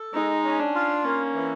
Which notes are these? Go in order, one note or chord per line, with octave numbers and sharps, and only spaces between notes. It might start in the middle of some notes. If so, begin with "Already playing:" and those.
Already playing: A4
G#3 D#4
C#4
D4
F4
A#3 C#4
E3